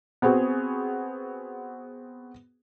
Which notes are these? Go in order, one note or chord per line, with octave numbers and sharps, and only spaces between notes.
B3 C4 F#4 G#4